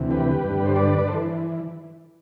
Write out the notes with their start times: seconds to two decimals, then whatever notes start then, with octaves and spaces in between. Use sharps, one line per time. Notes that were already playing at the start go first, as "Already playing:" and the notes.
Already playing: D2 C3 E3
0.11 G4 B4
0.44 G2 D3
0.66 C5
0.76 B4 D5
0.99 D5
1.08 A4 C5
1.13 E3